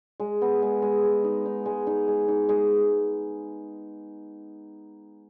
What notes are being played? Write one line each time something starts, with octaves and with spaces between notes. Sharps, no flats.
G#3
B3
G#3
G#3
G#3
D#4
D#4
G#3
D#4
G#3
D#4
G#3